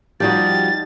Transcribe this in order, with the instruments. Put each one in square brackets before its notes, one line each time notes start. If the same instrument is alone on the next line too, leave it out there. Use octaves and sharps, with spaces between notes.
[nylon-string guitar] F3 G3 F#4 [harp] D#4 G4 [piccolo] A6